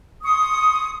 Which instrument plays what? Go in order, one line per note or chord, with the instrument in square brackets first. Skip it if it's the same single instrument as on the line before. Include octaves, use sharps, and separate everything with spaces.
[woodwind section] C6 C#6 D#6